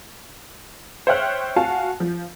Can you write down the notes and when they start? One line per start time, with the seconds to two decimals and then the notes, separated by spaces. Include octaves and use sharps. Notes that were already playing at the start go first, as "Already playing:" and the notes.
1.07 C5 C#5 E5 G5 F6 F#6
1.56 F#4 F5 F#5 G#5 A5
2.00 F3